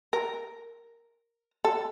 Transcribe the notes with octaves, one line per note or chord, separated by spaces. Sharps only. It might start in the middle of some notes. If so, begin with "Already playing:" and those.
A#4
A4